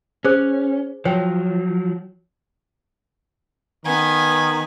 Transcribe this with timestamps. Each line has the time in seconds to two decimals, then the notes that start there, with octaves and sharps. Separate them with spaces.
0.25 C#4 G#4 C5 D6
1.05 F3 F#3 C#5 G5
3.85 D#3 B3 G#5